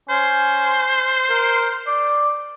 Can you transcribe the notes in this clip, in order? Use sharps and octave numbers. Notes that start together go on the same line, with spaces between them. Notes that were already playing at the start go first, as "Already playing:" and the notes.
C#4 C5
A#4
D5